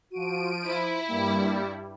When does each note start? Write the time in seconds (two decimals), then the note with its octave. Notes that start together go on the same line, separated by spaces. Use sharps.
0.12 F3 F#4 D7 D#7
0.67 E4 C5
1.08 G2 G3 A#3